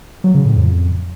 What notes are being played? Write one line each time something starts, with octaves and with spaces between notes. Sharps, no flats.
F#3
C#3
A2
F2